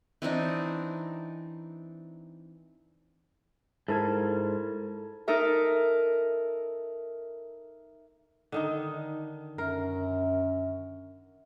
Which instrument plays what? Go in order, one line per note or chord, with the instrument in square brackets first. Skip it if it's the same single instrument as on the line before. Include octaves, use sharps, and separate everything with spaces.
[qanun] E3 C4 D4 D#4
[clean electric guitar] G#2 [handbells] E4 A#4 G#6 [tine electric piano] A4 A5
[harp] D#4 A4 A#4 E5
[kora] D3 D#3 D#4
[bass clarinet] F#2 [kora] A#4